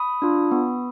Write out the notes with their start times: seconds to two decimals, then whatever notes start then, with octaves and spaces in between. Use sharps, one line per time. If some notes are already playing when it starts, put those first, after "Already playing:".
Already playing: B5 D#6
0.22 D4 F4
0.51 B3